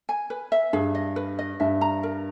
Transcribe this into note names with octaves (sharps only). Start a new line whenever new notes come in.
G#5
B4
E5
G2 G#4
D#5
B4
D#5
G2 E5
A#5
A#4